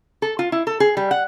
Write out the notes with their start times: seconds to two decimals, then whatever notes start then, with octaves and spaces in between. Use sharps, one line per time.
0.22 A4
0.39 F4
0.52 E4
0.67 A4
0.80 G#4
0.97 G3
1.11 F#5